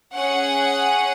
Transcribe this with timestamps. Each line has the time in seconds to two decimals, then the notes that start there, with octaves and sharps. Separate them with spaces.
0.13 C#4 G#4 F#5